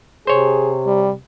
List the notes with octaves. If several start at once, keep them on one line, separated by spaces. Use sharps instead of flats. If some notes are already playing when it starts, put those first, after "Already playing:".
C3 G#4 C5 C#5
G3